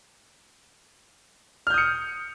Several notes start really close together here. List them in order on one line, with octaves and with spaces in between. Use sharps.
F6 G6 D#6 C#7